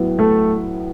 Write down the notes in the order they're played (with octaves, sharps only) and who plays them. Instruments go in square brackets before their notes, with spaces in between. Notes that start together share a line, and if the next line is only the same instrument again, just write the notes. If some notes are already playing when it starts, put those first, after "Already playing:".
Already playing: [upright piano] A2 F#3 B3 E4
[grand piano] A3 A4